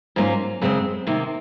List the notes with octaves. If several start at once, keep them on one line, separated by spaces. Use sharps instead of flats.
G#2 F#3 A#3 C#4 F4
F#2 C#3 G#3 C4
C3 D#3 A#3